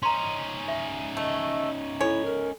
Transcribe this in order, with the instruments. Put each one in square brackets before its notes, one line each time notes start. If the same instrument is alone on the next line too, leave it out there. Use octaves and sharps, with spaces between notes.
[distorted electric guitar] C#4 D#4 [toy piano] A#5 C6
[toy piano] E5
[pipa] A3 [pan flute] D#5
[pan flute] E4 [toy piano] A4 G#5 [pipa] C#5
[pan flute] A#4